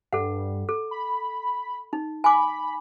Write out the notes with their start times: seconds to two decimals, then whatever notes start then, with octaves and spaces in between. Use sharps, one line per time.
0.13 G2 A4 F#5
0.69 A4
0.91 B5
1.93 D#4
2.24 G#5 B5 D6